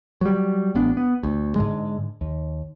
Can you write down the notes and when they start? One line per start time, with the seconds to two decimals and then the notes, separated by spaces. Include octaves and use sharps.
0.21 F#3 G3
0.75 A1 B3 D4
0.97 B3
1.23 D2
1.56 G#2 D3 G#3
2.21 D#2